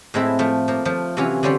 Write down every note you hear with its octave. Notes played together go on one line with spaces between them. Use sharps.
A2 G#3 C4 E4 E5
F3 A3
F3 A#3
F3 A3
C3 E3 F#3 C#4 F4
D3 G3 C#4 C5 D5